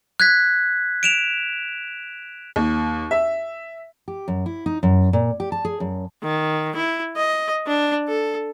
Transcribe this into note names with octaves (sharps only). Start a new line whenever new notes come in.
F#6 G#6 B6
D7 E7 F7
D#2
E5
G4
F#2
E4
D#4
F#2
A#2
G4
A5
G#4
F#2
D#3
E4
D#5
D4
A4